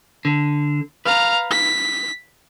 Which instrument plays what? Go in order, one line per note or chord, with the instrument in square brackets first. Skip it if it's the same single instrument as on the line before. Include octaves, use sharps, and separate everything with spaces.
[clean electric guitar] D3
[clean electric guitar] B4 [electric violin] F5 A#5
[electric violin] B6